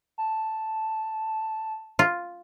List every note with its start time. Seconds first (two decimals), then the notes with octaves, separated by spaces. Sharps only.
0.18 A5
1.99 F4